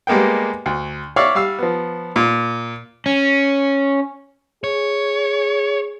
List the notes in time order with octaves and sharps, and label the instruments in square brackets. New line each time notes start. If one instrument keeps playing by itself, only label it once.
[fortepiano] G3 G#3 A#3 B3 G5
D2
C#5 D5 E5 F5 C#6
G3 F5 E6
F3 B3
A#2
[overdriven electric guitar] C#4
[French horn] G#4 [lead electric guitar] C#5